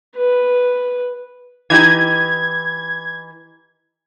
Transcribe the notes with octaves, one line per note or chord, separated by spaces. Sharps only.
B4
E3 D#4 G4 G#6